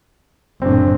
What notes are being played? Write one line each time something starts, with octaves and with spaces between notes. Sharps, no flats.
F#1 A2 C4 D4